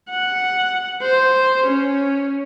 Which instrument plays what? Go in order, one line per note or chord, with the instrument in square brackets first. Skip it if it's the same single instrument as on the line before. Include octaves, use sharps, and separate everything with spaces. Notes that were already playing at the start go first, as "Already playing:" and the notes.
[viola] F#5
C5
C#4